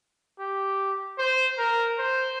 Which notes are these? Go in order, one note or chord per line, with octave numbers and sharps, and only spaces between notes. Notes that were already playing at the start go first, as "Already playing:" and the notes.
G4
C5
A#4
C5